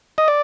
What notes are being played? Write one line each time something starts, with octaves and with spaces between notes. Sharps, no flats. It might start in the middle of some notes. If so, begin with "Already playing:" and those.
D#5
D5